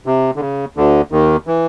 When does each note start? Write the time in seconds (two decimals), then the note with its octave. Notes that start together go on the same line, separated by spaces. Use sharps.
0.06 C3
0.36 D3
0.40 C#3
0.77 D2 D3
1.12 D#2 D#3
1.47 E3